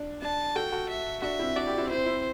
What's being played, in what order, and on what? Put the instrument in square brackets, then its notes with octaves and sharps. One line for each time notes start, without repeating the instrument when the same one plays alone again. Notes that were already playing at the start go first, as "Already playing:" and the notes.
Already playing: [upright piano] D4
[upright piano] D4 [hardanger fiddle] A5
[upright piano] F#4 A4 [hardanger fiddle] G5
[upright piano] F#4 A4
[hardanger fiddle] E5
[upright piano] D4 F#4 [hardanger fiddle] E5
[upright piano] C4 E4
[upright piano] D4 F#4 [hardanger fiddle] D5
[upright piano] E4 G4
C4 E4
[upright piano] C4 E4 [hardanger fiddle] C5
[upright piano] C4 E4